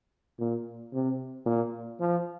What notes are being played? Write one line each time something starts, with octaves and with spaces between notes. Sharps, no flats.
A#2
C3
A#2
F3